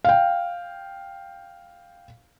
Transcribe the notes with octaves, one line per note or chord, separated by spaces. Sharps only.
F5 G5